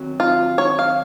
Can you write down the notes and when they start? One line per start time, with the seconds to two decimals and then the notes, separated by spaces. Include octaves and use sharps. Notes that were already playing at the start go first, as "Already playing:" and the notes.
Already playing: D#3 F#3 C4 F#4
0.20 F4
0.58 C#5
0.79 F5